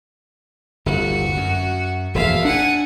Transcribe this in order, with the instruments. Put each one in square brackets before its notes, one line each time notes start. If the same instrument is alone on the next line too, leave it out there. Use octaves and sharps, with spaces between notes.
[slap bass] G1 D#2 C3 [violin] F#4
[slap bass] F#2
[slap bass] E1 A#1 F#2 [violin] E5 F5
[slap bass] D4 [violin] F#5 G#5